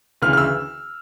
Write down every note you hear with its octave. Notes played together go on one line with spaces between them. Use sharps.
D2 C#3 E3 F6
F6
E6